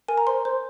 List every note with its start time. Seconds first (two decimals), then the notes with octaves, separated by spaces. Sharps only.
0.08 A#4 G#5
0.18 A#5
0.27 C5 C6
0.45 C5